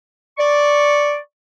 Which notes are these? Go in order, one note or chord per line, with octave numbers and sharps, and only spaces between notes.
D5 C#6